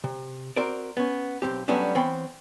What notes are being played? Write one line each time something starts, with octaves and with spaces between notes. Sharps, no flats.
C3
C4 F#4 A#4 C5 D5
B3 C#4
B1 A#2 C4 G4
F#3 G3 A3 B3 C#4 D4
E3 B3 C4 C#5 G5 B5